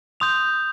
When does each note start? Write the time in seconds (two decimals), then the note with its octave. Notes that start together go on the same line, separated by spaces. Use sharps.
0.20 C6 D#6 G6 F7